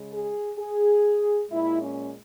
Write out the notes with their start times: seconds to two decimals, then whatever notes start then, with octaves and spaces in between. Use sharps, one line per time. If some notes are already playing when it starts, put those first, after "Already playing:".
Already playing: C#3 G#3
0.12 G#4
0.59 G#4
1.51 A#2 G#3 E4
1.82 C#4